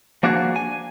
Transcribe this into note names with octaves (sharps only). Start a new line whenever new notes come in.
F3 A#3 D4 F#4 G#4
G#5